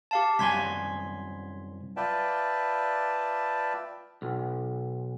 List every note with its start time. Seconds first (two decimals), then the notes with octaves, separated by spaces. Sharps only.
0.11 G4 F5 A5
0.39 C2 F#2 G#5 C6 G#6 B6
1.97 F4 B4 D5 E5 G5 A5
4.22 B1